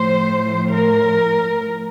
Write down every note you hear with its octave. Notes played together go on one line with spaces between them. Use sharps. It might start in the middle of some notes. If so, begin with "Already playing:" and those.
Already playing: A2 F3 C5
A#4